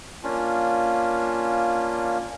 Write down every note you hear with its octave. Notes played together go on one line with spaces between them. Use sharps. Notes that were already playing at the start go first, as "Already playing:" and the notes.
A#3 C#4 D4 F4